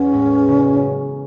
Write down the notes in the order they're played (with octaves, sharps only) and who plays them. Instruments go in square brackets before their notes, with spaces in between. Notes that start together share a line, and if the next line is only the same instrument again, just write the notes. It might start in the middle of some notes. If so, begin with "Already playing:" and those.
Already playing: [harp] E2 E3 [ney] C#4
[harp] A2 G#3 B3 E4
F#1 F#2 C#3